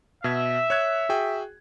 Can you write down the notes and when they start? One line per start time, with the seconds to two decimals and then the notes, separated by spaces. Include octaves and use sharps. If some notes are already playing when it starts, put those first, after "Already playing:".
0.24 B2 E5 G#6
0.70 C#5 F#6 G#6
1.09 F#4 G#4 G5